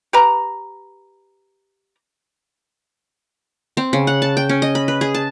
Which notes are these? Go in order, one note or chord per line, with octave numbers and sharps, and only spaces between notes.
G4 B4 A#5
C4
C#3
F#5
A5
G5
C#4
D#5
B5
B4
G#4
A5